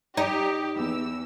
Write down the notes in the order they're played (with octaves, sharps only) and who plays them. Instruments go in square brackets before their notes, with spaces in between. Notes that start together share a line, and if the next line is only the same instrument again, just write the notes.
[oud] D#4 [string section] G4
[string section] E2 E6